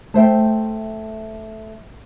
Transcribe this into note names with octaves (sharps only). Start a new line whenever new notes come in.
A3 C5 E5 G5